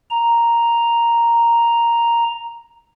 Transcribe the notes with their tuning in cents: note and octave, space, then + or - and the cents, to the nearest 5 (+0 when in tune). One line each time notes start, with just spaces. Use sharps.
A#5 +0